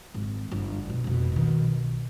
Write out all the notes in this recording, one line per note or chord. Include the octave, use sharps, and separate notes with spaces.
G#1
G1
B2 D3
F1 B2
B2 D#3
B1